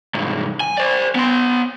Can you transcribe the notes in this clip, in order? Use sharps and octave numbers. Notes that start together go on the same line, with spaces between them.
C2 G#2
G#5
C5 D5
B3 C6